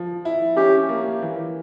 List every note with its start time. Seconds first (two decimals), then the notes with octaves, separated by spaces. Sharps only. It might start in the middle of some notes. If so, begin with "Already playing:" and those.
Already playing: F3
0.25 E4
0.57 C#4 G4
0.89 A#3
1.22 E3